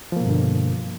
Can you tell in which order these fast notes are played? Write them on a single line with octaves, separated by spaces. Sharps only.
F3 A#3 B2 G2 D3